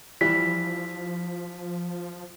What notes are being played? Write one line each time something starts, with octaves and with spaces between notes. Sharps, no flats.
E3 F3 G3 E4 B6